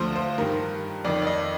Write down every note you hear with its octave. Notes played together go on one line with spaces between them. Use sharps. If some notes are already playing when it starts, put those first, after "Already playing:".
Already playing: D2 D3 F3 F4 C5
C5
G2 D#3 A#4
F2 D#3 D5
D5
D#5